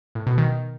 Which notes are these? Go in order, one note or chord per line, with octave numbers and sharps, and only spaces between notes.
A2
B2
D#3